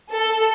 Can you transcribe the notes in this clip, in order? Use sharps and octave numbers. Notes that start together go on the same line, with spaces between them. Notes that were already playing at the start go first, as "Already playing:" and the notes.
A4